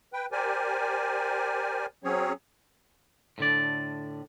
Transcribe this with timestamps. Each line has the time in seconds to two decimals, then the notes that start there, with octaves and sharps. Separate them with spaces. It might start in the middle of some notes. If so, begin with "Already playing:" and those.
0.13 B4 G5
0.32 G4 A#4 C5 D5 G#5
2.04 F#3 C4 C#4 G#4 C#5
3.38 A2 D3 D5